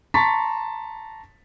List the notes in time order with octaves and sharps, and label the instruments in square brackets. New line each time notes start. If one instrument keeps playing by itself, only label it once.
[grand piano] A5 A#5 C6 C#6 A6 B6